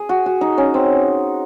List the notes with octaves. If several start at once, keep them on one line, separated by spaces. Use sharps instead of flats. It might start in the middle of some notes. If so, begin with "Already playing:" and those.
Already playing: G#4
F#4
F#4
D#4
C#4
C4